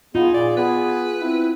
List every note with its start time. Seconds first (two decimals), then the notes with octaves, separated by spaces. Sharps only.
0.15 B3 D#4 F4 G#4
0.34 A#2 D5
0.57 B3 G#4 B4
1.21 C4 E4